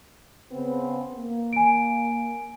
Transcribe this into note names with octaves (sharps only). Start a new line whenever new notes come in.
C#3 B3 C4
A#3
G#5 D7